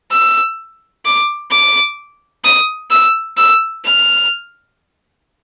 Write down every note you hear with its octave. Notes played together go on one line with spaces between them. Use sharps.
E6
D6
D6
D#6
E6
E6
F6